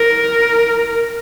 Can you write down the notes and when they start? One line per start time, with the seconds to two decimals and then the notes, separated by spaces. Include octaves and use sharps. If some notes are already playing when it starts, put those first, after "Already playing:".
Already playing: A#4